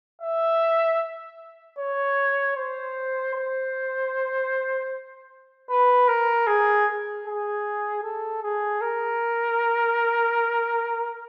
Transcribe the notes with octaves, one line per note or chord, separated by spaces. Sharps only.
E5
C#5
C5
C5
B4
A#4
G#4
G#4
A4
G#4
A#4